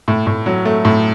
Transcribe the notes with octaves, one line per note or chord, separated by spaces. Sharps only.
A2
A2
F#3
A3
A2